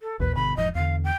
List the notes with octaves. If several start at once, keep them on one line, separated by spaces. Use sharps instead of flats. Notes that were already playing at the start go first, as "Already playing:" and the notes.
A4
A1 D#2 A#2 B4
G1 B2 D3 B5
E1 G#2 F3 D#5
E2 D3 F5
G5